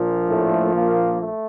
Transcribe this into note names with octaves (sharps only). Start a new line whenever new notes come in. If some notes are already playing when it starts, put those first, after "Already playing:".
Already playing: A#1 A#2 F3
A2 A3
A#2 A#3
A3